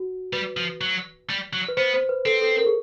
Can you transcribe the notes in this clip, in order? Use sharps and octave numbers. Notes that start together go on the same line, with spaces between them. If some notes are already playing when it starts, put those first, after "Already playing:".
Already playing: F#4
G3 B4
F3
F#3
G3
F#3
B4
B3 C5
C5
B4
C4 A4
A4
A#4
G#4